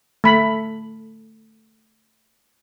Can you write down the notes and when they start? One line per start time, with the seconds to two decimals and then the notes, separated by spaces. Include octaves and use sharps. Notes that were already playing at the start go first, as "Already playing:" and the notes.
0.24 A3 B5